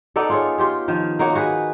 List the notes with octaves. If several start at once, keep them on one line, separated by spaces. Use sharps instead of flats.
B3 D#4 A4 D5
F4 G#4 C#5
F4 G4 C#5
D#3 F3
A#3 D#4 F#4 C#5
F#4 G#4 B4